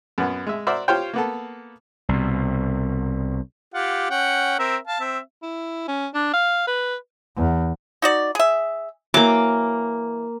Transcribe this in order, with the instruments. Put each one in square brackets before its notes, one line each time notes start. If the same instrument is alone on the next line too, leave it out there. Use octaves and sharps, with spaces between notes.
[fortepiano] F#2 B3
G#3 E5
F#4 A#4 C5 D5 E5
F4 G4 C5 C#5 G5
A#3 B3 A4
[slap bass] C2 B2
[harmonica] F4 G4 F#5
C#4 F#5 G5
C4 A#4 E5
F5 A5
C4 E5
[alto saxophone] E4
C#4
D4
F5
B4
[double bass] E2
[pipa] D#4 F#4 D5
G#4 E5
[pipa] E3 F#3 [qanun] A#3 D6